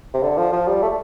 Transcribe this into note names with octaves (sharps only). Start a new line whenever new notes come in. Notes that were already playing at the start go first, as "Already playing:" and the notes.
C3
D3
F3
F3
G3
A3